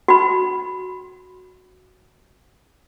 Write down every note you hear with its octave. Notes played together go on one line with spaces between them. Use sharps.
F#4 B5